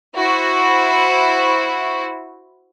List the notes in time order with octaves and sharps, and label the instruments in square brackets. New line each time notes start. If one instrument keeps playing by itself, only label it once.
[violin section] E4 F#4 C5